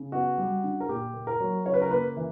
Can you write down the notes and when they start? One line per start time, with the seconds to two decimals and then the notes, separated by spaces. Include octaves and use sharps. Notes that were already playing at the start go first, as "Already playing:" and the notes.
Already playing: C#3
0.12 B3 F#4
0.38 G3
0.64 D3
0.80 A#4
0.89 A#2 G4
1.14 A#3
1.27 A#4
1.40 F#3
1.65 C#3 C#5
1.74 B4
1.82 A#4
1.91 A#3 B4
2.17 E3